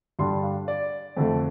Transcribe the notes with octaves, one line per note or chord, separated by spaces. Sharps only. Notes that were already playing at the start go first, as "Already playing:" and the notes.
G2 D3 G3 D4 C6
F5
D5
F2 D3 A3